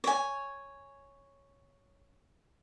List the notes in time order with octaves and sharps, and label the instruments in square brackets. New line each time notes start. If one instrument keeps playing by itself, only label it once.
[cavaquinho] C#5 G#5